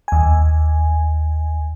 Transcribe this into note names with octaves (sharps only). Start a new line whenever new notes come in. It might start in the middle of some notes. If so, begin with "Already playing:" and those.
D#2 G#5